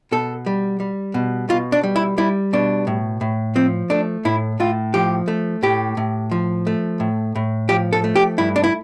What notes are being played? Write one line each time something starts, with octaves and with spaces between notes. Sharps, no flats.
B2 A4
G3
G3
B2
B2 F4
D4
G3
E4
G3 E4
B2 D4
A2
A2
F3 C4
A3 D4
A2 E4
A2 F4
F3 G4
A3
A2 G4
A2
F3
A3
A2
A2
F3 G4
A4
A3
G4
G2 E4
D4
E4